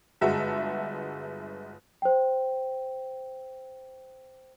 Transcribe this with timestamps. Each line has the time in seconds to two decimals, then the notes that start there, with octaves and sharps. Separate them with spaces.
0.21 G1 G#3 F#4 E5
2.02 C5 G5